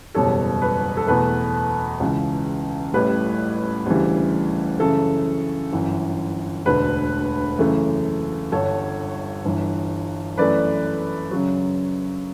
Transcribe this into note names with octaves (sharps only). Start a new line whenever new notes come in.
F#1 E2 B2 G3 A4 C#5
B4
A4
E2 B2 A3 B4
C#2 C#3 E3
A1 A2 G3 B4
D2 C#3 E3 G3
F#2 C#3 E3 A3 A4
G1 F#2 E3
E1 D2 D3 B4
F#2 C#3 E3 A3
G1 G2 D3 A4 C#5
G1 G2 E3
F#2 E3 A3 B4 D5
F#2 C#3 F#3